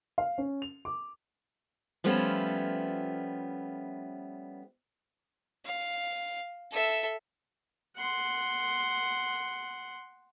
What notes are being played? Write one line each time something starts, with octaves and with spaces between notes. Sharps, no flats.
F5
C#4
F7
D6
F3 G3 A3 B3 C#4 F4
F5
A4 E5
F#5 C6